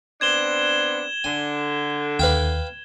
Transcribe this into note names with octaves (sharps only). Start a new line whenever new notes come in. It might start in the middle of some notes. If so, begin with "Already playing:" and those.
B3 C4 D4 G#6 E7 G7
D3 G#5
D#2 B4 F5 G5